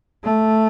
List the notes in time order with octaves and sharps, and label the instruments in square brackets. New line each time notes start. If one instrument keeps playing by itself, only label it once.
[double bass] A3